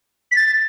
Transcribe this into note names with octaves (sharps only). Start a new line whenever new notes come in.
B6
A6